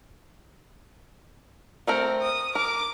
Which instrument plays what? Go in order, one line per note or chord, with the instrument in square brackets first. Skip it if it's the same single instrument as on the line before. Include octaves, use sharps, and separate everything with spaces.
[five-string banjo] A3 C4 A#4
[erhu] D#6
[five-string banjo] A#4 [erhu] D6